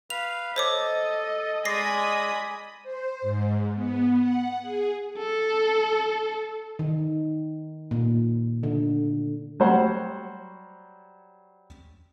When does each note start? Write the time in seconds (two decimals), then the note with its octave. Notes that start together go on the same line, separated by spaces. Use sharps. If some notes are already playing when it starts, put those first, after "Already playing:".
0.10 B4 F5 F7
0.56 A4 C5 C#5 D#5 D6
1.65 G#3 D5 D#5 G#5 B5 D#6 A#6 C7
2.83 C5
3.22 G#2
3.75 B3
4.20 F#5
4.62 G#4
5.18 A4
6.79 D#3
7.91 A#2
8.63 D3
9.60 F#3 G3 C5 C#5 F#5